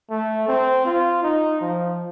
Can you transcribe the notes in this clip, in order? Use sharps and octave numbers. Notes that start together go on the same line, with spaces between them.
A3
C4
F4
D#4
F3